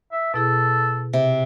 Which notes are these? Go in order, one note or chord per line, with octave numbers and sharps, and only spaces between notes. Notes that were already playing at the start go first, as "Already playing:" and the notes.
E5
B2 E4 G#4 A4
C3